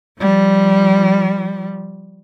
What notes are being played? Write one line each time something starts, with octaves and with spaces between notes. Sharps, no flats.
F3 G3